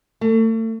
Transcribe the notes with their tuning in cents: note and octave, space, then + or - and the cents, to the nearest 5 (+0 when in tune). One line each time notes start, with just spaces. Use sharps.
A3 +35